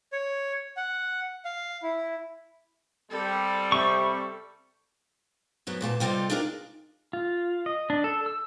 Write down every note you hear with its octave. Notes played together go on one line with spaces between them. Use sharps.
C#5
F#5
F5
E4
G3 C4 A4
C3 C#6
F#2 F#3 B3
E2 A#2 G#4 A5
C3 G3 F4 G4 A4 D#5
D4 D#4 F4 G#4 A#4
F4
D#5
D4
A4
E6